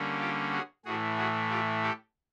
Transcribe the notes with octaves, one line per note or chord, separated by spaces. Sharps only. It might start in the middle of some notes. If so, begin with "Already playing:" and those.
Already playing: D3 G3 A#3 C#4
F4 G4
F#4 G#4
A2 E3 A3 F#4 G#4
F#4 G#4
F4 G4
G4 A4